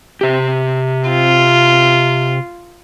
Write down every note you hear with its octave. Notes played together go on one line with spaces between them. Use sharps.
C3 G4
F4